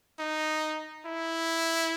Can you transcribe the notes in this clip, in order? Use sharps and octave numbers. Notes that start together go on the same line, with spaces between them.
D#4
E4